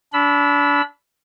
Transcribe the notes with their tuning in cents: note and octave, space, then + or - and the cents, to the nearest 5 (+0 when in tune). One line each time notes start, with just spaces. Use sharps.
D4 -30 B5 +0 E6 +0